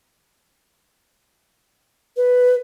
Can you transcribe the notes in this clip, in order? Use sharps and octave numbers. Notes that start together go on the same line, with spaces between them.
B4